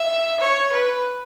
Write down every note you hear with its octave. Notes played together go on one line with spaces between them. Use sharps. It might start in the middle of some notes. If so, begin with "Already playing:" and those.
Already playing: E5
C#5
B4